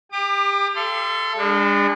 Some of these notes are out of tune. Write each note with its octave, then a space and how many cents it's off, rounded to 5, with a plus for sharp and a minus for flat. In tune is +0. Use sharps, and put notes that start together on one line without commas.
G4 +25 D6 +45
A4 +0 F5 -45 C6 -25
G#3 -40 D4 +0